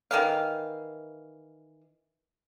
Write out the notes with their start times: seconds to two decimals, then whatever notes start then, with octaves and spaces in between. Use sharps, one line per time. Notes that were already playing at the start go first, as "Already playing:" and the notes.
0.11 D#3 E3 F5